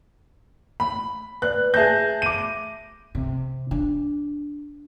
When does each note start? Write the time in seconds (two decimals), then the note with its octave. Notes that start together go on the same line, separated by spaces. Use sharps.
0.80 B5
1.42 B4 D5 F#6
1.74 G#4 E5 A5 G6 A#6
2.22 D6 D#7
3.15 C3
3.71 D4